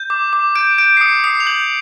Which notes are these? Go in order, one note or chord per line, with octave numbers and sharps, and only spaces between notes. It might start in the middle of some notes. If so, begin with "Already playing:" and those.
Already playing: G6
D6
D6
G6 D7
G6 D7
C7
D#6 C#7
D#6 C7
F7
G6 F#7